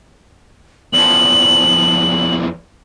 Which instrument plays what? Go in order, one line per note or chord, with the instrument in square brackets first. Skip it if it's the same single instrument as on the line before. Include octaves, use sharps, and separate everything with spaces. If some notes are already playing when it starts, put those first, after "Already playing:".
[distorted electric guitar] E2 F3 [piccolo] F#7